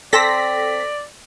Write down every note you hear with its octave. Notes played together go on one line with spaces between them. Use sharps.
C4 A4 D5 A#6 B6